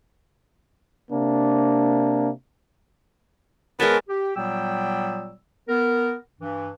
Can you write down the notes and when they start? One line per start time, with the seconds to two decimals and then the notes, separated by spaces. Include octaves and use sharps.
1.12 C3 A#3 D4
3.80 G#3 B3 A#4 C#5 A5
4.08 G4
4.36 A#2 F#3 G3 B3 G5 E6
5.69 B3 A#4
6.41 G2 E3